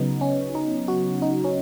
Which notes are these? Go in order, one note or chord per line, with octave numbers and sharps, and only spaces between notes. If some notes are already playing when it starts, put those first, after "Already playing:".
Already playing: C#3 F#3 B3 D#4
C#4
D#4
F#4
D#4
C#4